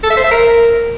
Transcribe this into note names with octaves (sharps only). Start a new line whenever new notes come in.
A4
E5
C5
E5
A#4